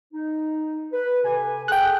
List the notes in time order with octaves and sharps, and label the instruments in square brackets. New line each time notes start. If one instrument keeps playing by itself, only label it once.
[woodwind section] D#4
B4
C3 A4 G#5
[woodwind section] G#4 A4 [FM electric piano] G5 F#6